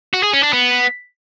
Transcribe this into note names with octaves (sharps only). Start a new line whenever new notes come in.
F#4
G#4
C#4
D4
B3